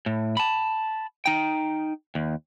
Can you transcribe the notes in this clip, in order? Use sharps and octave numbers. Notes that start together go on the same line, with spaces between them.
A2
A5 B5
D#4 G5
D#2